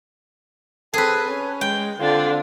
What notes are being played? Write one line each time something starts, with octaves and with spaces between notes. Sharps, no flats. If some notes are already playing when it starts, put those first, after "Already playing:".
C4 G#4 A4 B4
C#4
G#3 G5
D3 C4 D4 F4